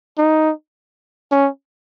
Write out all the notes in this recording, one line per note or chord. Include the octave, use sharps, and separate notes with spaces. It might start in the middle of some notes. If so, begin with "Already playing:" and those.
D#4
C#4